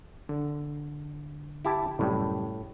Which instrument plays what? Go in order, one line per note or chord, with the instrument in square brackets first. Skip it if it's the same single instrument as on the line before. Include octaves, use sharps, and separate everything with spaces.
[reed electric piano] D3
[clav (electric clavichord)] E4 G4 A5
[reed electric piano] C2 F#2 G3 [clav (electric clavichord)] A2